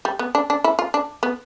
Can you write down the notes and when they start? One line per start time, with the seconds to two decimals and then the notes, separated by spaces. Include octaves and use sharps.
0.05 G3
0.19 B3
0.35 D4
0.50 D4
0.64 E4
0.79 F4
0.94 D4
1.23 B3